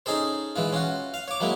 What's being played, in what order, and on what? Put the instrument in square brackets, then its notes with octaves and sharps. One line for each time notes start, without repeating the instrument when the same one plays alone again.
[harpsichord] C#4 D#4 G#4 A4 C5
E3 G#3 F4
C#4 F4 F#4
F5
C#5 D6
F#3 G#3 A#3 E4